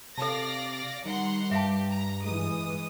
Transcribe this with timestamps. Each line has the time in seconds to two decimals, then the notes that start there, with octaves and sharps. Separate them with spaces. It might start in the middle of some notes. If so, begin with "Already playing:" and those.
0.18 C3 A4 D5 F5 A5 A#6
1.05 D#3 G3 F#5 A#5 C6
1.51 G2 G4 E5 F5 A5
1.91 A#5
2.24 E3 G#3 D#6